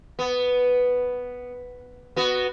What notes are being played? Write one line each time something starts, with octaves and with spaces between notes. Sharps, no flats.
B3
B3 F#4